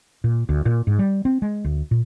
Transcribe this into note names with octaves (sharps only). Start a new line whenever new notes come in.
A#2
D2
A#2
G#2
G3
C4
G#3
D2
A#2